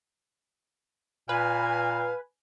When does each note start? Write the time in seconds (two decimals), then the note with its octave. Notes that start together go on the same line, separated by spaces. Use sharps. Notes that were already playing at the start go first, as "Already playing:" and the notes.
1.29 A#2 B4 F5 G#5